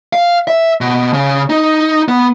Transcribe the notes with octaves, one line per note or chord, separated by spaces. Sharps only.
F5
E5
B2
C#3
D#4
B3